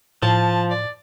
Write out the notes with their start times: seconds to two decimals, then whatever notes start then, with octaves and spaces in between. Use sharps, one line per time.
0.23 A2 F3 A5
0.70 D5